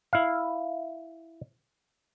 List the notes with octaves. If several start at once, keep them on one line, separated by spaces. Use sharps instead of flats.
E4 F5